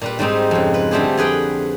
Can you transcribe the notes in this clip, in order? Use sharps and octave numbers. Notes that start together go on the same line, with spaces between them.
A#2 G3 B4
G#2 G3 C4 D#4
F2 C#3
B4
D3 G3 A3 C4 G4 G#4
F2 G#4 B4 G5